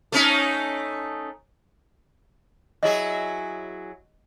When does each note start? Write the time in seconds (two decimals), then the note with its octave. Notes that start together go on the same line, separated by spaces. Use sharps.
0.12 A3 C#4 D#4
2.83 F#3 E4 G#4 D#5